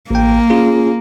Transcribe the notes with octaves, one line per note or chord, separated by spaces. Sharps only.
A1 A#3 G5
C#4 F4 G#4